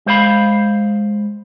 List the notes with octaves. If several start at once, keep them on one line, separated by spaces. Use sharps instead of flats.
G#3 C5 F5 B5